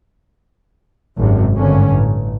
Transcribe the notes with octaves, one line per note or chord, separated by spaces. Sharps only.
G#1 F#2 C3
G#1 G2 D3 C#4
A1